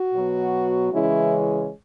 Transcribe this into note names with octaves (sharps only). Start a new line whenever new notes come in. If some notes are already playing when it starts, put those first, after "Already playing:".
Already playing: F#4
B2 F#3 B3
C#3 E3 G#3 C#4 E4